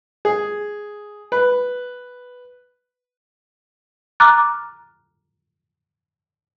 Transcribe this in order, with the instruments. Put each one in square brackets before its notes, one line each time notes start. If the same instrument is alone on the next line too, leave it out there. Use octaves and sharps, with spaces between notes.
[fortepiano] G#4
B4
[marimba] A#5 D6 F6 F#6 A6